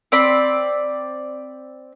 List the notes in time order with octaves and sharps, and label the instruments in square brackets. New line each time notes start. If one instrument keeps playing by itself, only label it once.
[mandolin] C4 D5 B5